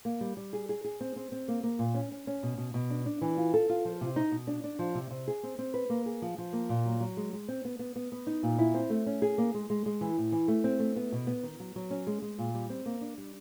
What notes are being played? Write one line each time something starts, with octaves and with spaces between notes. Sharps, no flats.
A#3
G3
G3
G#4
G#4
G#4
C4
C4
C4
A#3
A#3
A#2
C#4
C#4
C#4
B2
B2
B2
D4
D4
E3
F4
A4
F4
F3
C3
D#4
B2
D4
D4
F3
C3
C3
G#4
C4
C4
B4
A#3
G#4
F3
F3
A#3
A#2
F#3
F#3
G#3
G#3
C4
B3
B3
B3
B3
D#4
A#2
E4
C4
A3
C#4
G#4
A#3
G#3
G#3
G#3
E3
A2
E3
A3
C4
A3
B3
B2
B3
D#3
F#3
F#3
C#4
G#3
G#3
A#2
G3
C4
A#3
D4
G3